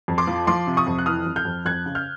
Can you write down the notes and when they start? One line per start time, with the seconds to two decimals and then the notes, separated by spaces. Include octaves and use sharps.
0.08 F2
0.18 C6 D6
0.27 F3
0.47 F3 C6 D6
0.67 C3
0.77 C#6 D#6
0.86 F2
0.98 F#6
1.06 E3 D#6 F6
1.26 F2
1.36 F6 G6
1.45 F2
1.65 F2 F#6 G#6
1.86 C#3
1.95 F6 G6